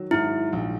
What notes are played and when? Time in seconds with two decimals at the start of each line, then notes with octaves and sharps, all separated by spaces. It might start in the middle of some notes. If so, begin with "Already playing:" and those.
Already playing: D#3 F#3
0.11 G#2 E4
0.53 A#1